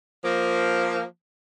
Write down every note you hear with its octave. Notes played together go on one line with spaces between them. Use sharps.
F3 A#3